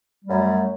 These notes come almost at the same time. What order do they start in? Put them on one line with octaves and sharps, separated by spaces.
G3 A3 F#2